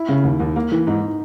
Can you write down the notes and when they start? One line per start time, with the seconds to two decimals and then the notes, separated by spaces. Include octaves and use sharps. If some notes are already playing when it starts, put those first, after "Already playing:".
Already playing: E4
0.09 C#3
0.24 D#2
0.40 D#2
0.56 A#3
0.72 E3
0.87 G#2 D#4